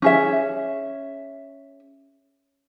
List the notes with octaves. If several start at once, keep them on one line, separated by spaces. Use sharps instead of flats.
C#4 G#4 E5